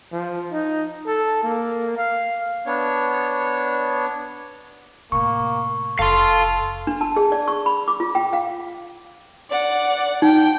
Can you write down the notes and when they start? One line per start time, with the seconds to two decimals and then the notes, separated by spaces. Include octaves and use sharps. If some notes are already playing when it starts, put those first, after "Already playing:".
0.12 F3
0.52 D#4
1.06 A4
1.43 A#3
1.97 F5
2.66 B3 D4 C#5
5.12 A2 C3 A#3 C#6
5.99 F1 A4 F5 C6
6.87 D4
7.01 A5
7.16 G#4
7.32 D5
7.48 C#6
7.66 B5
7.88 D6
8.00 F4
8.15 G5
8.33 F5
9.50 D5 F#5
10.22 D#4 G5